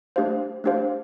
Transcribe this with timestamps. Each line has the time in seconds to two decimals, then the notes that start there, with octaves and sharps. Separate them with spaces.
0.16 A3 D4 G4 C5 F5
0.64 A3 D4 G4 C5 F5